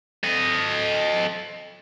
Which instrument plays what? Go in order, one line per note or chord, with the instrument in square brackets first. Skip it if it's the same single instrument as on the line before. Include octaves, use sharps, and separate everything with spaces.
[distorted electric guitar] A4 D#5